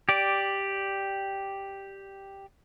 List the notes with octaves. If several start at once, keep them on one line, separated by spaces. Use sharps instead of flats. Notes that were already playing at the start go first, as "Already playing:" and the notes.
G4 D5